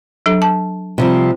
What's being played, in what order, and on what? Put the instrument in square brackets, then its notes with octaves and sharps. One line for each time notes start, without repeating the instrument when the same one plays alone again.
[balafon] F#3 D4 A4
A5
[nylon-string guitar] C3 F3 G3